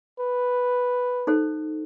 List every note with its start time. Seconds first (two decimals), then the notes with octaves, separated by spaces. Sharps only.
0.20 B4
1.27 D#4 A4 C5